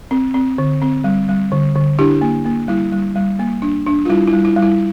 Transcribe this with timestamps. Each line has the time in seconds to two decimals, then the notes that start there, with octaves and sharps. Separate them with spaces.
0.11 C4
0.34 C4
0.58 D3
0.82 C4
1.04 G3
1.29 G3
1.52 D3
1.75 D3
1.99 D4 E4 G4
2.21 A#3
2.45 A#3
2.68 G3 E4
2.92 G3
3.16 G3
3.39 A#3
3.62 D4
3.86 D4
4.05 F4
4.09 G3 E4
4.28 E4
4.33 G3
4.45 E4
4.56 G3
4.62 E4